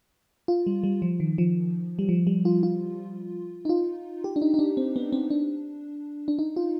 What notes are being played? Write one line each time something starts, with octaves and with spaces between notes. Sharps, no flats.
F4
G3
G3
F3
D#3
F3
G3
F3
G3
F4
F4
D#4
F4
G4
D4
D#4
D#4
D4
C4
B3
C4
D4
D4
D#4
F4